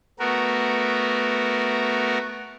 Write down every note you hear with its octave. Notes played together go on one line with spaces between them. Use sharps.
A3 B3 F#4 A#4